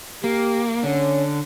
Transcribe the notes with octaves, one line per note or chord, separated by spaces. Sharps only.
A#3 G4
D3 C#4